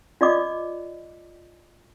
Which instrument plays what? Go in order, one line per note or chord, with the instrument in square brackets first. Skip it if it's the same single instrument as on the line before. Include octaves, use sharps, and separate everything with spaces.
[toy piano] F4 D5 D#5 D6